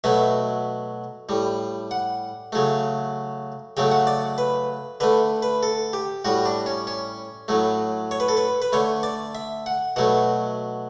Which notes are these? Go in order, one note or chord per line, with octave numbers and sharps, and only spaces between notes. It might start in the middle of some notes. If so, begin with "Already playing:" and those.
B2 F#3 A3 E5
A2 G3
F#5
C#3 F#3 A3
C#3 F#3 A3 G5
F#5
D5
B4
D3 A3 B4
B4
A4
G4
A2 G3 F#4
D4
C#4
C#4
A2 F#3 A3
C#5
B4
A4
B4
B4
D3 A3 C#5
D5
E5
F#5
B2 F#3 A3 F#5